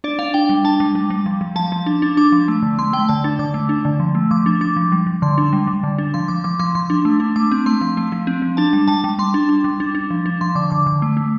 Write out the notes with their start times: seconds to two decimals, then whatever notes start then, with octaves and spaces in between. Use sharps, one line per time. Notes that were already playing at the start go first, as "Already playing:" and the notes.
0.04 D4 D5
0.19 D4 F5
0.34 D4 G5
0.49 G3
0.64 D4 A5
0.80 G3
0.95 G3
1.10 G3
1.26 F3
1.41 F3
1.56 F3 A5
1.72 F3
1.86 D4
2.02 D4
2.17 D4 D6
2.32 F3
2.48 A3
2.62 D3
2.79 A3 C6
2.93 A3 G5
3.09 D3 A5
3.24 D4
3.39 D3 D6
3.54 A3
3.69 D4
3.85 D3
4.00 F3
4.15 A3
4.31 F3 D6
4.46 D4
4.61 D4 D6
4.76 F3
4.92 G3
5.07 G3
5.22 D3 C6
5.38 D4
5.53 G3
5.67 G3
5.83 D3
5.98 D4
6.14 F3 C6
6.28 F3 D6
6.44 F3 D6
6.59 F3 C6
6.75 F3 C6
6.90 D4
7.05 A3
7.20 D4
7.36 A3 D6
7.51 C4
7.66 A3 C6
7.81 F3
7.97 A3
8.12 F3
8.27 C4
8.42 F3
8.57 D4 A5
8.73 G3
8.88 G3 A5
9.04 G3
9.19 G3 C6
9.34 D4
9.49 D4
9.64 G3
9.80 D4
9.95 D4
10.10 F3
10.26 D4
10.41 F3 C6
10.55 D3 D6
10.71 D3 D6
10.86 D3
11.02 A3
11.17 A3